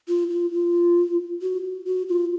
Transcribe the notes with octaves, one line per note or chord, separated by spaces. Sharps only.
F4
F4
F4
F#4
F#4
F4